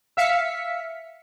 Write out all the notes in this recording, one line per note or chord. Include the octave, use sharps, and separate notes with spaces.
E5 F5 B6 C#7